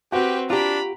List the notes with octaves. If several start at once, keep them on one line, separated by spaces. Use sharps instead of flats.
C4 F#4 G4 B4
D4 F4 G4 A#5 B5